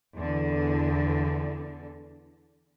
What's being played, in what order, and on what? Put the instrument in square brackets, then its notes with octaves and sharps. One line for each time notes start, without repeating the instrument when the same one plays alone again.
[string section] E2 D3